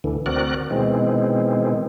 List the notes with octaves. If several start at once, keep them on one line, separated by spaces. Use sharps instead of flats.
D2 D3 E3
D2 C4 F#4 A#4 D5 F#6
B2 D#3 E3 G#3 C4